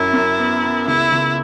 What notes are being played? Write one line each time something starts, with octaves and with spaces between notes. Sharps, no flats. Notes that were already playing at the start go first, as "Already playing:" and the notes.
Already playing: F#2 E4
F#2
B3
B3
C#2 E4
C#2